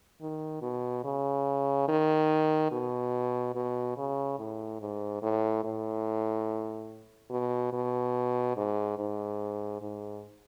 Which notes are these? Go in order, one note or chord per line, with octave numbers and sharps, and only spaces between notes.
D#3
B2
C#3
D#3
B2
B2
C#3
A2
G#2
A2
A2
B2
B2
G#2
G#2
G#2